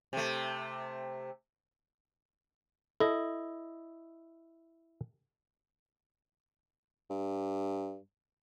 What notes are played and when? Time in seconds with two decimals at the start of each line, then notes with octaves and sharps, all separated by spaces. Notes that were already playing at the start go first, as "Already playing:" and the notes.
0.13 C3 A3
3.00 E4 A4 D#5
7.10 G2